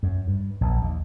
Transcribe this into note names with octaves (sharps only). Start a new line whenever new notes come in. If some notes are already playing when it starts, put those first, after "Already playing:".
F#2
G2
A#1
D#2